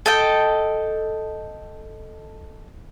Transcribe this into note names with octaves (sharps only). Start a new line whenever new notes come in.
A4 D#5 G5